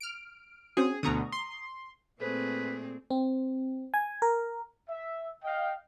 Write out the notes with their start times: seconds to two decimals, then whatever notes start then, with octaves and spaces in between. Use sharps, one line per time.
0.01 F6 D7
0.77 C4 C#4 F#4 G#4
1.03 D2 B2 D3 A#5 C#6 D#6
1.32 C6
2.20 A#2 A3 C4 G#4 A4 B4 C5
3.10 C4
3.94 G#5
4.22 A#4
4.89 E5
5.44 D#5 F5 G5